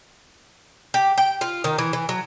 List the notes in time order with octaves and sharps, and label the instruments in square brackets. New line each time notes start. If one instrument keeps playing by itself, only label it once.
[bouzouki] G4
G5
F4
D#3
E3
E3
F#3